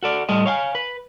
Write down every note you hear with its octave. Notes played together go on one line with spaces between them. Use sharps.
F#4 A4 D5
A2 G3 A4 D#5
C#5 F5 G5 G#5
B4